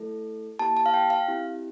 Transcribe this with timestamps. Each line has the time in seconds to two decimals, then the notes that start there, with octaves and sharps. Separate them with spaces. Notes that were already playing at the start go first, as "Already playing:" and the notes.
Already playing: A3 E4 A4
0.59 A#3 E4 G4 A5
0.77 A5
0.86 F5
0.94 G5
1.10 F5
1.28 C4 E4 G4